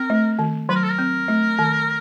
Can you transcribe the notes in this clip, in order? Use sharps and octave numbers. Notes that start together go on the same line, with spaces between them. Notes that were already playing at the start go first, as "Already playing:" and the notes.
Already playing: C4 A#4
A3
D#3
F#3 B4
A#4
A4
A#4
C4
A3
D#3